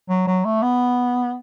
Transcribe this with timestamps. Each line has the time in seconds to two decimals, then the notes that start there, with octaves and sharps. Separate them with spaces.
0.09 F#3
0.27 F#3
0.45 A3
0.62 B3